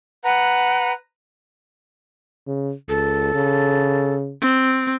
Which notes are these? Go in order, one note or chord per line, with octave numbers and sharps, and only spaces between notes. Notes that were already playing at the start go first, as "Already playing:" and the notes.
B4 F#5 A#5
C#3
C#2 A4
C#3
C4